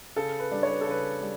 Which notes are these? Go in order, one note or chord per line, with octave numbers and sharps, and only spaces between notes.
C#3 A4
B4
G3 D4
C#5
B4
A4
C#3 B4
G3